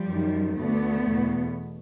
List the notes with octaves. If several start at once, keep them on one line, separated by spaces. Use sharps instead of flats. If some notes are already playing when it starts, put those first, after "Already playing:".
Already playing: F3 G3
F#2 D#3
D2 D3 A3 B3
E2 B2